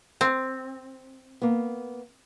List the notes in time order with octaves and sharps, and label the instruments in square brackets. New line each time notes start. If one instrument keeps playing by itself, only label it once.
[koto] C4
[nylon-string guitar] A#3 B3